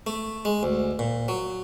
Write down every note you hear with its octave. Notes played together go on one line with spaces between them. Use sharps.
A3
G#3
D2
A#2
F#3